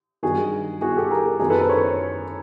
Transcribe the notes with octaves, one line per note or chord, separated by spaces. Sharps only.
G2 D#3 F#3 F#4 G#4
F#4 G#4
G4 A4
G#4 A#4
F#2 D#3 F#3 G#4 A#4
A4 B4
A#4 C5
B4 C#5